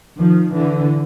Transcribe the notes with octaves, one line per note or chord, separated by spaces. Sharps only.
D#3 F3
D3 E3